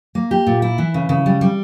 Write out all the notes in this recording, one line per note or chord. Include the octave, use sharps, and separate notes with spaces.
A#3
G4
A#2
E4
E3
C#3
C#3
G3
G3